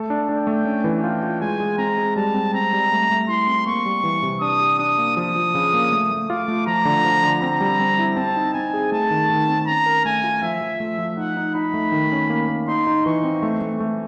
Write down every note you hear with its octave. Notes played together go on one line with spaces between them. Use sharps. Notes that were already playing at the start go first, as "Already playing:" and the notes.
Already playing: A3 A4
D4
D4 G5
A3
C#4
E3
F4 G5
F4
G#3 G#5
G#3
C4 A#5
G#3
G3 A5
C4
C4 A#5
G3
A3
A3
E4 C6
C4
A#3 C#6
G3
E3
C3
D4 D#6
G4
D4 D#6
A#3
F3 D#6
F3
C#3
A#3
A3
A3
F4 D6
A3
F3 A#5
D3
F3
D3
C4 A#5
G3
C4
E4
C4 A5
D#4
C4 G#5
G#4
A3 A5
D#3
D#3
C4
C#4 A#5
A#4
A3 G#5
F4
F3 E5
F3
A3
F3
D#4 F#5
D#4
D#4 B5
A3
D#3
C#4
A#3
A#3
D#4 C6
D#4
E3 C#6
C4
A3 C#6
A3
A3